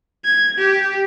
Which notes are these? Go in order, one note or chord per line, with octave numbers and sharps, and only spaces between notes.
G#6
G4